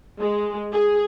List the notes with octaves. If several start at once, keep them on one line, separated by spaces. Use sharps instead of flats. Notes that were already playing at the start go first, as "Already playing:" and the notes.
G#3
G#4